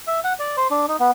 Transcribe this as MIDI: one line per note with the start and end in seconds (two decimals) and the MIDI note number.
0.07 0.20 76
0.24 0.33 78
0.39 0.56 74
0.57 0.68 72
0.71 0.86 62
0.88 0.97 63
1.00 1.11 59